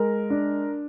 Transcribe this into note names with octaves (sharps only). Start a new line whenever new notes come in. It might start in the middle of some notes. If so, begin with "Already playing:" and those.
Already playing: G#3 A#4
D4